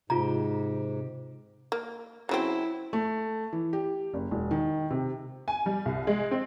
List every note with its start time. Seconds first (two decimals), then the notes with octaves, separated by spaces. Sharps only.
0.10 G#2 C3 F4 G4 A#5
1.72 A#3
2.29 C#3 F#3 C4 E4
2.93 A3
3.53 E3
3.73 G4
4.14 F#1
4.31 E1
4.51 D#3
4.90 C3
5.48 G#5
5.66 G3
5.85 C2
6.07 G#3
6.31 C4